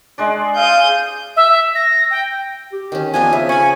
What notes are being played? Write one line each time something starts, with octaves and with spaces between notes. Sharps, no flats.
G#3 D4 D5
F5 D#6 G6
E5
A#6
G5
G4
D#3 C#4
F3 B3 D4 D#4 G#5
C#3 E5
C#4 G#5 B5 C#6